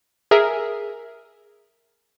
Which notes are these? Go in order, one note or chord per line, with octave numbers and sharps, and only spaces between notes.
G#4 A#4 E5